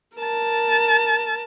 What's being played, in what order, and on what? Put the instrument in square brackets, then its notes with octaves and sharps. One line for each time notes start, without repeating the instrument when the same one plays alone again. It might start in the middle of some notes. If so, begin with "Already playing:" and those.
[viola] A#4 A5